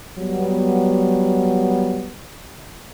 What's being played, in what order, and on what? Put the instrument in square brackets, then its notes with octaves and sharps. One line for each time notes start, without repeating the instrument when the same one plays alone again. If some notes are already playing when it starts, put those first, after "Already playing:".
[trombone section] F#3 G3 B3